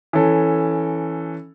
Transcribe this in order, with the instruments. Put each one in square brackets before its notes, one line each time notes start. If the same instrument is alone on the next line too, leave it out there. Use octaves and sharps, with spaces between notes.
[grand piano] E3 C#4 A4